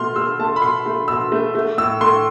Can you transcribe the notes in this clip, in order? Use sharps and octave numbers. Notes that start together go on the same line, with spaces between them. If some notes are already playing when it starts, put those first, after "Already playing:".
Already playing: B2 A3 C6 F6
A3 E6
A3 A5
B5
B2 C6
A3
B2 E6
A3
A3
A2 E6
A2 C6